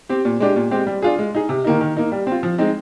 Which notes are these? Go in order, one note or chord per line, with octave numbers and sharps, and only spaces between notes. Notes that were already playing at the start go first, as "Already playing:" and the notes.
C4 G4
A#2
G#3 D4 G4
A#2
G#3 C4 G4
G3
D4 F4 G#4
G#3
D#4 G#4
C3
D#3 A#3 D#4
D#3
A#3 D#4
G3
C4 F4
F3
G#3 C4 D#4